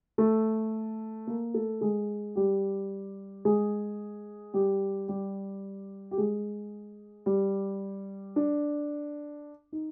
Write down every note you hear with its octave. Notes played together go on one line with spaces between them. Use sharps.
A3 A4
A#3 A#4
A3 A4
G#3 G#4
G3 G4
G#3 G#4
G3 G4
G3 G4
G4
G#3 G#4
G3 G4
D4
D#4